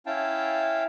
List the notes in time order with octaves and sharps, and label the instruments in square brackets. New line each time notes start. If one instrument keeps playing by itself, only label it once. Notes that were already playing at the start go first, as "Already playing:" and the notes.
[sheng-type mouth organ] C#4 E4 F5 G5 A5